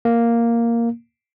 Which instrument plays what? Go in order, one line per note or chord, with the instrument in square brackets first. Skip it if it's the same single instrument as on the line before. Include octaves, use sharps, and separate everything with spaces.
[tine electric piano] A#3